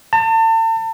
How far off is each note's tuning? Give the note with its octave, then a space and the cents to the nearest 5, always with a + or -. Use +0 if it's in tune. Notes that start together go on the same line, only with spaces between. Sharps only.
A5 +40